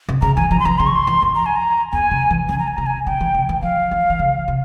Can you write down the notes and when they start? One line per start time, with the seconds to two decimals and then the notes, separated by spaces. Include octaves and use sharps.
0.09 C3
0.22 C#3 A#5
0.36 E3 G#5
0.51 F3 A#5
0.60 C6
0.65 E3 A#5
0.78 C#3 C6
0.87 C#6
0.96 C6
1.07 E3
1.22 F2
1.35 A#5
1.46 G#5
1.56 A#5
1.92 E2 G#5
2.11 C3
2.31 E3
2.49 C#3 G#5
2.59 A#5
2.67 G#5
2.77 C3 A#5
2.86 G#5
3.06 C3 G5
3.21 E3
3.34 C#3
3.49 E3
3.62 F3 F5
3.91 E3
4.10 E3
4.19 C#3
4.48 C3